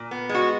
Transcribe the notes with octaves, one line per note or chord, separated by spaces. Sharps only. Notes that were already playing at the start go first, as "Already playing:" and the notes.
Already playing: A#2
B3
G#3
F#4